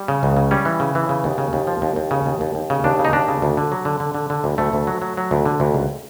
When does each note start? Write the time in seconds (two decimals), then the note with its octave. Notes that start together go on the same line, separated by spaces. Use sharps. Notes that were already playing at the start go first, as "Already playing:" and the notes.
Already playing: G3
0.08 C#3
0.23 C#2
0.37 C#3
0.51 G3 C#4
0.65 E3
0.80 C#3
0.95 E3
1.09 C#3
1.24 D#2
1.38 C#3
1.53 D#2
1.67 F3
1.82 D#2
1.96 D#2
2.11 C#3
2.26 D#2
2.41 D#2
2.55 D#2
2.70 C#3
2.84 D#2 D4
2.99 C#3
3.05 D#4
3.13 D#2 D4
3.28 C#3
3.42 D2
3.57 D3
3.72 F#3
3.85 D3
4.00 D3
4.15 D3
4.30 D3
4.44 D2
4.58 D2 A3
4.73 D2
4.87 F#3
5.02 F#3
5.17 F#3
5.31 D2
5.46 D3
5.60 D2
5.74 C#2